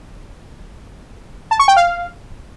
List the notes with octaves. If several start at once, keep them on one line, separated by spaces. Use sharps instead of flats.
A5
C#6
G5
F5